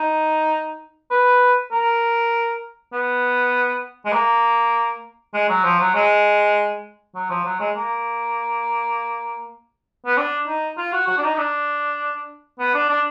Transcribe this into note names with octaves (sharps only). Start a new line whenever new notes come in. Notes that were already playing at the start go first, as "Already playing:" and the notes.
Already playing: D#4
B4
A#4
B3
G#3
A#3
G#3
F#3
F3
F#3
G#3
F#3
F3
F#3
G#3
A#3
B3
D4
D#4
F4
F#4
F#4
D4
D#4
D#4
D4
B3
D4
D4